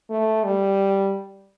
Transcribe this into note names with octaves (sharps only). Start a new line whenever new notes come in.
A3
G3